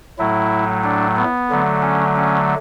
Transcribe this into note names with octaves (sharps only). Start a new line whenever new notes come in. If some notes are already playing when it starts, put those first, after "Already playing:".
A2 F#3 A3 E4
D4
B3
D3 F#3 A3
C#4
C#4